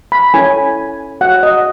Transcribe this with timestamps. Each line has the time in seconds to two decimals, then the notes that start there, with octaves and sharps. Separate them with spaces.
0.12 B5
0.34 C#4 E4 A4 C#5 G#5
1.21 F#4 C#5 F#5
1.43 D#5